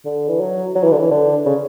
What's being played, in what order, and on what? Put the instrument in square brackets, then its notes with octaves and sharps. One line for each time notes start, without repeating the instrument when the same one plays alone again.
[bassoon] D3
E3
F#3
F#3
E3
D3
E3
D3
C#3